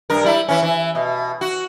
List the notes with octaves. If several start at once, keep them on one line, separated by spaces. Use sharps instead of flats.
G2 A#4
G3 E4
E3 C#4
E3
B2
F#4